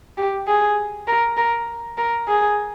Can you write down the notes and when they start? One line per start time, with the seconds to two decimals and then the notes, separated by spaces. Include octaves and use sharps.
0.17 G4
0.47 G#4
1.07 A#4
1.37 A#4
1.97 A#4
2.28 G#4